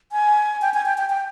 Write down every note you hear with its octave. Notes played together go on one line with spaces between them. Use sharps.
G#5
G5
G#5
G5
G5
G5